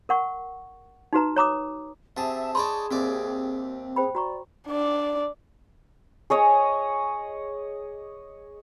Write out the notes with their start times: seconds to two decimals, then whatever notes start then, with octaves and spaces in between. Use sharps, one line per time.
0.09 A#4 F#5 C#6
1.13 D#4 F#4 B4 A#5
1.36 C#5 A#5 D6 D#6
2.17 C3 G#4 E5 F#5 A5
2.55 D#4 G#4 C#5 D5 B5 C6
2.91 D#2 C3 C4 D5
3.96 G#4 C5 G5 B5
4.15 F#4 D5 A#5 C#6
4.67 D4 D5
6.30 G#4 C#5 D#5